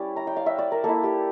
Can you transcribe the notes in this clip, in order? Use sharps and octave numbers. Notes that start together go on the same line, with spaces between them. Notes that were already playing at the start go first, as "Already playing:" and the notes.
Already playing: G3 C#4 E4 D5
A#5
G5
F5
E5
D5
A#4
A#3 A4
E4
G4